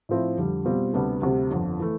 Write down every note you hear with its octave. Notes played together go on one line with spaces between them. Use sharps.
A2 F3 C4 E4
F2 D3 G3
B2 G3 C4 F4
D2 C3 G3 B3 D4
D2 C3 G3 C4
G1 F2 D3
E3 A3